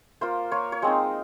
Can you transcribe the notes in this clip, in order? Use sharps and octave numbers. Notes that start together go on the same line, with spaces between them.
A#3 F4 C5
A#3 F4 C#5
C#5
G#3 C4 D#4 C5